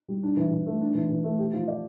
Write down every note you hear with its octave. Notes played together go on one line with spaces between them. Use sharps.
G3
D4
E3
E3
A3
D4
E3
E3
A3
G4
F3
D5